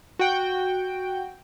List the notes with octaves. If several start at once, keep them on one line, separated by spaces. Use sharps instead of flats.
F#4 G5